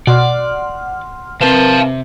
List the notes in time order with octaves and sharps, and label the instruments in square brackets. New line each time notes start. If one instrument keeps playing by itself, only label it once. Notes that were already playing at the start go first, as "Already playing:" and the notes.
[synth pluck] B2 [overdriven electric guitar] D5 [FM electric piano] F#5 C6 F6
[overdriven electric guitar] C3 [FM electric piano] C4 A#4 B4 [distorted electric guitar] F5 A5